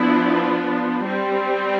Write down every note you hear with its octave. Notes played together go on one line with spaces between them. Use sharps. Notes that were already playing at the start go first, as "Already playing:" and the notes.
Already playing: F3 B3 D4 E4
G3 C4